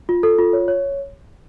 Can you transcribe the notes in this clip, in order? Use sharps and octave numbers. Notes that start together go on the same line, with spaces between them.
F4
A4
F4
C#5
C#5